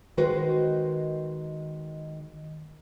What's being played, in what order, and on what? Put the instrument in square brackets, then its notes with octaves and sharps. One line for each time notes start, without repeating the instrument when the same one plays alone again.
[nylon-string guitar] D#3 G#3 F#4 B4 C5